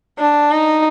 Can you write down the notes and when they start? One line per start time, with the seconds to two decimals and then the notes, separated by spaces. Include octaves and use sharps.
0.19 D4
0.51 D#4